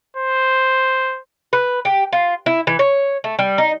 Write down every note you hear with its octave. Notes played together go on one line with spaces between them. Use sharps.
C5
B4
G4
F4
E4
E3
C#5
A3
G3
D#4